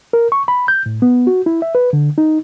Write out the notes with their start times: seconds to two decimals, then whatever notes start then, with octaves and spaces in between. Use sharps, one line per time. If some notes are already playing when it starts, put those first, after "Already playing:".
0.13 A#4
0.32 C#6
0.48 B5
0.68 G6
0.86 A2
1.02 B3
1.27 F#4
1.46 E4
1.62 E5
1.75 B4
1.93 D3
2.18 D#4